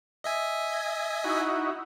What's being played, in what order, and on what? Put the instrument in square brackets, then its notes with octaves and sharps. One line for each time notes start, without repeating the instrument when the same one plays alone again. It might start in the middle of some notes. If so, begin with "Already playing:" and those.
[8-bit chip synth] D#5 E5 G#5
[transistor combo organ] D#4 E4 F#4